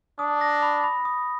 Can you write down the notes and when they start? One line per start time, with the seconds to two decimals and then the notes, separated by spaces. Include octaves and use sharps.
0.19 D4 D#6
0.41 A#6
0.63 B5
0.84 B5
1.05 D#6